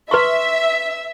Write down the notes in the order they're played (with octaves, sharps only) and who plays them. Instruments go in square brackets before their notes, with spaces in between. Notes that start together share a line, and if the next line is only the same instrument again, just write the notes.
[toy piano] B4 C6 C#6 [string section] E5